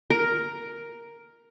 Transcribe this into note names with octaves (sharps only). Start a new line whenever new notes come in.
A#4